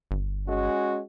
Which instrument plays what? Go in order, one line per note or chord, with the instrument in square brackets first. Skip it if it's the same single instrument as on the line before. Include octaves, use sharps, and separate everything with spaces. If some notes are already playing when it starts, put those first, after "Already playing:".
[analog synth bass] G1
[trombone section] G#3 C#4 F#4